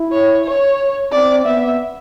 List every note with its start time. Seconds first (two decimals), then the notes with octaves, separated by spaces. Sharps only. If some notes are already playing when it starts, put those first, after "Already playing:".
Already playing: E4
0.12 C#5
0.45 C#5
1.12 C4 D5
1.45 B3 E5